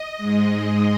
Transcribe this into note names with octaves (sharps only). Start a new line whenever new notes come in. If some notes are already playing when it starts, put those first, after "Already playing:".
Already playing: D#5
G#2 G#3